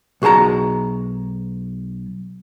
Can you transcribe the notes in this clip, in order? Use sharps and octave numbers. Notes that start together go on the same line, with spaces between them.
B1 F#4 G#4 A5 A#5